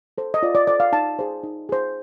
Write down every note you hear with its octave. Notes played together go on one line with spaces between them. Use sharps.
A4 C5
D#5
F4 D5
D5
A4 C5 D5
F5
D#4 A5
G#4 C5
D#4
G#4 C5